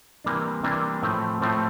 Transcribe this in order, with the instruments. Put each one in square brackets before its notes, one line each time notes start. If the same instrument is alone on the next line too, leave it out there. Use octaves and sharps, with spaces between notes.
[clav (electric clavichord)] C3 E3 G3 A#3 D4
C3 E3 G3 A#3 D4
A2 F3 A3 C4
A2 F3 A3 C4